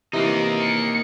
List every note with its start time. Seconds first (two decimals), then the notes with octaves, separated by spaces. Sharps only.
0.13 C3 E3 A#3 D#4
0.62 C#7